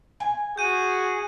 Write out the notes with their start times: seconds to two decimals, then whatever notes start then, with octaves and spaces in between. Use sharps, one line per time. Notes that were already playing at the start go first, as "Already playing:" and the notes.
0.20 G#5
0.58 F#4 G#4 G6 D#7